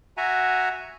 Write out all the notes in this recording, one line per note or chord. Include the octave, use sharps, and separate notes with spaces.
F#4 E5 F#5 G#5 A#5